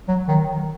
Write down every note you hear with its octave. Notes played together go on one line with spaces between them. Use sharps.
F#3
D#3